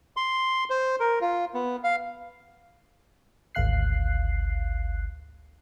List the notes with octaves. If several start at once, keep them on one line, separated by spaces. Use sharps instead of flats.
C6
C5
A#4
F4
B3
F5
G#1 D2 F5 F#6 C7